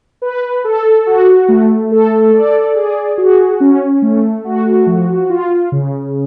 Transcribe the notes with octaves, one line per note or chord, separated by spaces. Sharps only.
B4
A4
F#4
A3
A4
D5
G#4
F#4
C#4
A3
F#4
F3
F4
C#3